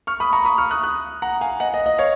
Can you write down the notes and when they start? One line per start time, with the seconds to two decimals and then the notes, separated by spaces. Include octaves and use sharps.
0.07 C#6 F6
0.20 B5 D#6
0.33 A#5 C#6
0.45 B5 D#6
0.58 C#6 F6
0.71 D#6 F#6
0.83 D#6 F#6
1.22 F#5 A#5
1.41 F5 G#5
1.60 D#5 F#5
1.74 D#5
1.86 D#5
1.98 C#5 F5